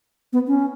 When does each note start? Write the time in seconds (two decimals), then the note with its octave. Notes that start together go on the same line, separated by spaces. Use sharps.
0.33 B3
0.48 C#4